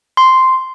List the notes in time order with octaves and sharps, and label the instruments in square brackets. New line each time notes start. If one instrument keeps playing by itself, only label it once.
[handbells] C6